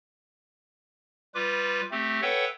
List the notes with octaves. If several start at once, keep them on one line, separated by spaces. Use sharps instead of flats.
G3 F4 B4 D6
A3 C4 G4
A4 B4 C#5 E5 F#5 G5